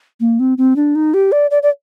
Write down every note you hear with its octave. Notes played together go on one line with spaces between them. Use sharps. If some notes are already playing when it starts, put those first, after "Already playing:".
A#3
C4
C4
D4
D#4
G4
D5
D5
D5